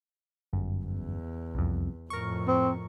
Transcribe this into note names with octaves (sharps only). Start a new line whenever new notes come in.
G1 F#2
E2
C2 F2
F2 A2 A#4 C#6
C4